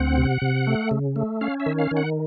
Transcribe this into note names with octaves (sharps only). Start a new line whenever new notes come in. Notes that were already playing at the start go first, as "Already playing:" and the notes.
Already playing: D2 C4 F#5
C3
C3
A3
C#3
A3
C#4 F5
E5
D#3
F5
D#3
F#5